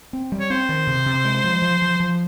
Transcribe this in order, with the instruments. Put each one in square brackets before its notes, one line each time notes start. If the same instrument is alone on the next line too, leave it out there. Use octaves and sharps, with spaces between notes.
[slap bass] C4
G3
[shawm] C#5
[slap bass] C4 [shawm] C5
[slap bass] D#3
C3
C3
G#3
F3
F3
F3
F3